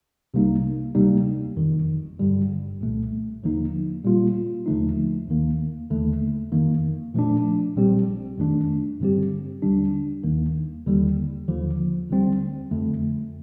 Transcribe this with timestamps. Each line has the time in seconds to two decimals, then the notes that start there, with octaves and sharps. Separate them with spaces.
0.34 C2 C3 G3 A#3 D#4
0.95 D2 C3 G3 A#3 D#4
1.56 G1 F2 D#3
2.19 G1 G2 D3 G3
2.81 C2 A#2 A3
3.43 D#2 D3 F3 A#3 D#4
4.04 A#2 G3 A#3 F4
4.66 D#2 D3 F3 A3 D#4
5.28 D#2 D#3 A#3
5.90 D#2 D3 A3
6.52 F2 D#3 A#3
7.14 A#2 F3 A3 D4
7.76 A#1 A#2 G3 C4 G4
8.38 F2 D#3 A3 D4
9.00 G2 D3 G3 C4 G4
9.62 D#2 D3 G3 D4
10.23 D#2 D#3 A#3
10.86 D#2 D3 G3
11.48 D#2 D3 F3
12.10 D2 D3 G3 C4
12.71 F2 D3 A3